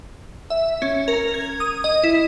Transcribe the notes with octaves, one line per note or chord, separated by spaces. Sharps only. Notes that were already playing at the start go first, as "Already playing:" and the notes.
E5
C#4
A#4
G#6
D#6
D#5
E4